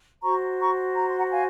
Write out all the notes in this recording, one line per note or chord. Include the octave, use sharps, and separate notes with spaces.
F#4 C5 A#5 C#6
A#5 C#6
A#5
C6
F#5 A#5
F5 G#5